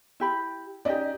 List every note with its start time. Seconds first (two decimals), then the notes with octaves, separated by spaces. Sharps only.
0.20 E4 G4 B5
0.85 C#4 D#4 G4 D5 D#5